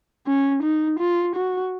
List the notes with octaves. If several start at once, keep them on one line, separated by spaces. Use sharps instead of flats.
C#4
D#4
F4
F#4